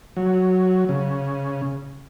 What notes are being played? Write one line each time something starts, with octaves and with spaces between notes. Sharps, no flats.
F#3
C#3